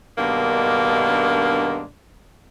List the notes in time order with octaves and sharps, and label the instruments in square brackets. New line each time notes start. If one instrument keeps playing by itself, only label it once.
[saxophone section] G2 B2 D#3 G#3 A#3 D4